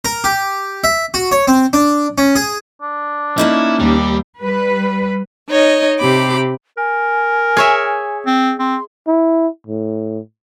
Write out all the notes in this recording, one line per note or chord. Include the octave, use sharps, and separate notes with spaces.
A#4
G4
E5
F#4
C#5
C4
D4
C#4
G#4
D4
A#3 C#4 D#4 E4
D#2 G3
G3 B4
D#4 C#5 D#5
C3 G4 B5 D6
A#4 G#5
G#4 C#5 E5
C4
C4 C6
E4
A2